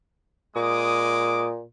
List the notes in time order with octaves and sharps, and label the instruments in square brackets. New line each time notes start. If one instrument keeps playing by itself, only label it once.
[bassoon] A#2 [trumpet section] G#3 D6 D#6